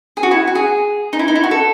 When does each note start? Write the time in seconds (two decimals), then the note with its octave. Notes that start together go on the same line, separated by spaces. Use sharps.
0.17 G#4
0.23 F#4
0.31 E4
0.47 F#4
0.55 G#4
1.13 D#4
1.19 E4
1.28 D#4
1.35 E4
1.44 F#4
1.51 A4